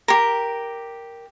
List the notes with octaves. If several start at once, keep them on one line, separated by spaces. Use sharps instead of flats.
G4 A#4